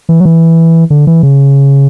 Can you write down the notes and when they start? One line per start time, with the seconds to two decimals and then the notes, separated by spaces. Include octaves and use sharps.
0.09 E3
0.20 F#3
0.25 E3
0.90 D3
1.07 E3
1.23 C#3